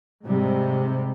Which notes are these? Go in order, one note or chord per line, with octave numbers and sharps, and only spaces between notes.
G#2 C3 G3